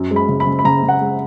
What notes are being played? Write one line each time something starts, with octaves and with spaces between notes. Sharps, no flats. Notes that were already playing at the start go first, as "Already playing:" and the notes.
Already playing: F#2
G#3
B5
C#3
B5
C#3
B5
C#3 A#5
C#3
F#5
G#3